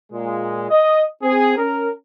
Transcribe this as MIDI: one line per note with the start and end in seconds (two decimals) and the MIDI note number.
0.12 0.67 46
0.12 0.67 56
0.70 1.03 75
1.23 1.54 60
1.23 1.54 68
1.58 1.89 61
1.58 1.89 70